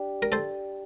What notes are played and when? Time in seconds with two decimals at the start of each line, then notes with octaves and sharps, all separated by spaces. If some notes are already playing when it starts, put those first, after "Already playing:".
Already playing: D4 G4
0.22 A#4
0.32 A4 C5